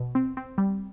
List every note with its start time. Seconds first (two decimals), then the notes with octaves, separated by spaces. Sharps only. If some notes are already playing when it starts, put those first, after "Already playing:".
Already playing: B2
0.15 C4
0.37 C4
0.58 G3